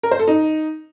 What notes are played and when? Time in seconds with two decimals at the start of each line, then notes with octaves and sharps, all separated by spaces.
0.03 A#4
0.11 C5
0.20 A4
0.28 D#4